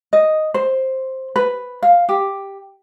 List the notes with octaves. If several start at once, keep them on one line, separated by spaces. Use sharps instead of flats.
D#5
C5
B4
F5
G4